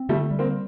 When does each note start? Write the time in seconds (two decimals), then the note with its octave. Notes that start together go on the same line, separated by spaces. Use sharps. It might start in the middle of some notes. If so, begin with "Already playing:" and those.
Already playing: C4
0.09 D3 G3 A3
0.31 G3
0.39 A#3 C4